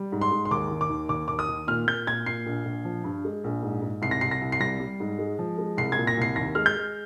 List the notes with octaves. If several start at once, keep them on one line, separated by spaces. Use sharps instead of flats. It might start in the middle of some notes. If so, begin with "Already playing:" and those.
Already playing: G3
G#2
C6
G#2
C6
D#2 D6
D#3
D6
D#2
D#2 D6
D#2 D6
D#6
D#3
A#2 F6
A#2 G6
A#2 G#6
A#2 C7
A#1
A#1
F3
G2
G#3
A#1
G#2
G#2
C2 C7
A#6
C2 C7
A#6
C2
C7
G3 A#6
G3
G#2
G#3
F3
G#3
C2 C7
G#6
A#2
A#6
C2 C7
D#2 A#6
G#3 F6
G6
G#3